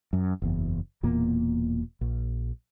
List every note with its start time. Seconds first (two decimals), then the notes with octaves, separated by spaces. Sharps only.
0.13 F#2
0.42 F#1 E2
1.03 E1 E2 A#2 A#3
2.01 A#1